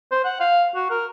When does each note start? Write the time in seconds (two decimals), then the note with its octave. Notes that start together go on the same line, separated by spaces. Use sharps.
0.12 C5
0.24 F#5
0.40 F5
0.75 F#4
0.91 A#4